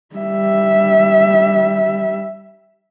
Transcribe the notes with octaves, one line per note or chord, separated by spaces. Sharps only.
G3 E5